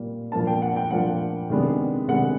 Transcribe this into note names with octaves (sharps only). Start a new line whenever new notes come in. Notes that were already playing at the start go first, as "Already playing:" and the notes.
Already playing: A#2 G3 A#3
A#2 F3 A#3 D4 A5
G5
F#5
G5
A#2 F3 A#3 D4 F#5
C3 D#3 G#3 B3 D4
C3 D#3 G#3 B3 D4 F#5